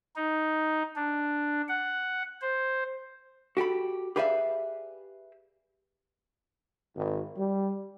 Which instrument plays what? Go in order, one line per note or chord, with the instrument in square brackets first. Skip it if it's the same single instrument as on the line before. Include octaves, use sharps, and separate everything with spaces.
[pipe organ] D#4
D4
F#5
C5
[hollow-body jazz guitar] F#4 G4 A4 B5
G4 G#4 B4 D5 E5 F5
[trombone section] G#1
G3